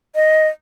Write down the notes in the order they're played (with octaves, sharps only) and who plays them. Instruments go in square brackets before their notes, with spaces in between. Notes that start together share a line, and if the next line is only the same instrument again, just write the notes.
[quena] D#5